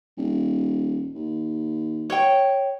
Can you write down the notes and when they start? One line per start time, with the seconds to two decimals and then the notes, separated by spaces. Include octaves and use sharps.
0.17 D#1
1.14 D#2
2.10 C#5 G5